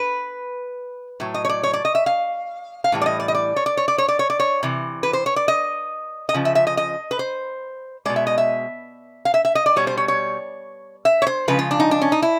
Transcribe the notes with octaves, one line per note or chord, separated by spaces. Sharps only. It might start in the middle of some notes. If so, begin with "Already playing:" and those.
Already playing: B4
A2 F#3
D#5
C#5
D5
C#5
D5
D#5
E5
F5
F5
A2 E3 G3
D5
D#5
D5
D#5
D5
C#5
D5
C#5
D5
C#5
D5
C#5
D5
C#5
C3 E3
B4
C5
C#5
D5
D#5
D#5
C#3 F3
E5
E5
D#5
D#5
B4
C5
B2 G#3 D5
E5
D#5
E5
F5
E5
E5
D#5
D5
B2 G3 C#5
C5
C#5
C#5
E5
C#5
C5
C#3 F3 G#3 B4
F4
D4
D#4
D4
C#4
D#4
E4